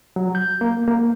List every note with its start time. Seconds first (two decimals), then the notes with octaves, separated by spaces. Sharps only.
0.16 F#3
0.35 G6
0.61 A#3
0.88 A#3